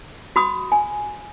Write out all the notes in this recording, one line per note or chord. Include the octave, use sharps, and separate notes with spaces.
F#4 B5 D#6
G#5